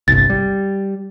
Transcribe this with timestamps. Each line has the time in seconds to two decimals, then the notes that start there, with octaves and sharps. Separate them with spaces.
0.08 G1 C2 A6
0.30 G3